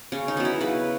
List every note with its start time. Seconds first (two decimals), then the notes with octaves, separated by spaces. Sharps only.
0.12 C#3 C#4
0.28 D#4
0.37 F#3 B3
0.45 E4
0.61 C#3 B4